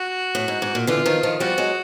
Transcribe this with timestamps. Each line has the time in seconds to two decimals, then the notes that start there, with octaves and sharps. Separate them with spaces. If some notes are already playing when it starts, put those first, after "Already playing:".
Already playing: F#4
0.35 A2
0.48 G#2
0.62 G#2
0.75 A#2
0.87 D3 E3 F4
1.06 D#3 F3
1.23 D#3 F3
1.40 F3 G3 F#4
1.58 F#3 G#3